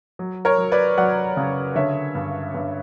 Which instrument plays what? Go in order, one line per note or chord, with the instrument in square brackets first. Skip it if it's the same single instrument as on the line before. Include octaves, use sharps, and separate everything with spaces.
[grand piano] F#3
[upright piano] A#4 C#5
[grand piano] F#3
[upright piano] B4 D5
[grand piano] F#3 [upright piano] D5 F#5
[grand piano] C#3
[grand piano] D3 [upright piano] C#5 E5
[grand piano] G2
G2